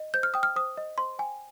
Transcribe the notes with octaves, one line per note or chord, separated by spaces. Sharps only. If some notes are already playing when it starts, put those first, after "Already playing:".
Already playing: D#5
C5 G6
F6
G5 D#6
F6
C5 D#6
D#5
C5 C6
G5 G#5